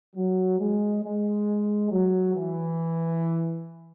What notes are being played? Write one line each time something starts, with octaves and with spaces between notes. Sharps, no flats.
F#3
G#3
G#3
F#3
E3